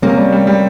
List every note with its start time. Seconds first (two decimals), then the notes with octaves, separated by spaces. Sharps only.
0.02 C3 A#3 C#4
0.17 G3
0.32 G3
0.47 G3